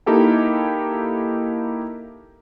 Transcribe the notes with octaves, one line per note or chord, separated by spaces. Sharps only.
A#3 D#4 E4 G4 A4 G5